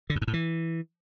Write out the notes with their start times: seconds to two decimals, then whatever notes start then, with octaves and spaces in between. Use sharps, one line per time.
0.10 D3
0.16 F#2
0.22 G#2
0.27 A2
0.33 E3